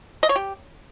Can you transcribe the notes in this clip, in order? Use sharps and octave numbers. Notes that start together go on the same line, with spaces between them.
D#5
C#5
G4